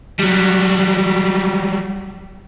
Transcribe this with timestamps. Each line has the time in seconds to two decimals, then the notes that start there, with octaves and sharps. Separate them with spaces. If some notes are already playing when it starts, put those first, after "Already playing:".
0.20 F#3 G3